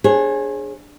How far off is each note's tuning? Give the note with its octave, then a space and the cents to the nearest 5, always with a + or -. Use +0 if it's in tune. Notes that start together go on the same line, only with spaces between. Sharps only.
D4 +0 G#4 +0 C#5 -45